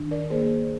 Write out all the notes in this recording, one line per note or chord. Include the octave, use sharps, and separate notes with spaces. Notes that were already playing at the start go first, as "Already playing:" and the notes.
Already playing: D#3 D4
A#4 D5
A#3 G#4 C5